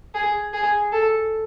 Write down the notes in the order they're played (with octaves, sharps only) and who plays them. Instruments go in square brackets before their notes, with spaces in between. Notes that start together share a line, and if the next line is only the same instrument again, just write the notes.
[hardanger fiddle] G#4
G#4
A4